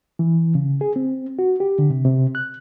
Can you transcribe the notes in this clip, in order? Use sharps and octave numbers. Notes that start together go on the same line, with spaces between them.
E3
C#3
G#4
C4
F#4
G4
D3
C3
C3
F#6